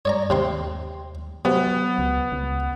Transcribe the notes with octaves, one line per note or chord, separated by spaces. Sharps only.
G2 C#5 D5 A#5
D#2 C3 C4 C6
C3 F#3 B3
C#2
C#2